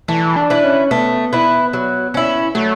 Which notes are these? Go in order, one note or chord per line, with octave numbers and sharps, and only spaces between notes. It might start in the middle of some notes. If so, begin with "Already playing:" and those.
E3 A3
D4
E4 B4
C#4
A3 B3
E4 B4
F#3
C#4 E4
F#3 A3